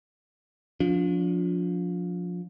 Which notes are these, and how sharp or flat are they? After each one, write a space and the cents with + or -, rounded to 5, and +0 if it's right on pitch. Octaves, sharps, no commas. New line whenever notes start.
F3 +25 D4 -30